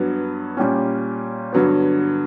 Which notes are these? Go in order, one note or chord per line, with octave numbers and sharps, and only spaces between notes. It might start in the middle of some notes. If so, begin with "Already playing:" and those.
Already playing: G2 F#3 B3
A#2 G3 C#4
G2 D3 F#3 B3